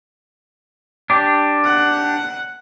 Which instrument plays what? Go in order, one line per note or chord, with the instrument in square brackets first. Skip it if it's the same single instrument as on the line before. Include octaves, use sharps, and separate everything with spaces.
[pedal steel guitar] D4 G4
[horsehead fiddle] F#5